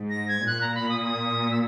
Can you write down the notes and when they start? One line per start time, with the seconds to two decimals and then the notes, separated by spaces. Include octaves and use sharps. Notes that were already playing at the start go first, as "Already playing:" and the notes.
Already playing: G#2
0.10 A#6
0.28 G#6
0.47 A#2 F#6
0.61 A#5
0.75 B5
0.89 D#6
1.02 D#6
1.51 E6